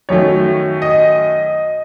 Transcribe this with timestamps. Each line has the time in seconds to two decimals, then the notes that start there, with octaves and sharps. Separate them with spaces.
0.09 F#2 D#3 F#3 A3 C#5
0.82 D#5